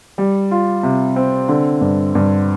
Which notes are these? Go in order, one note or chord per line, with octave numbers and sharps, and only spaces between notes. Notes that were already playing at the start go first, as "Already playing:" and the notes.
G3
F4
C3
C4
D3
G2
G2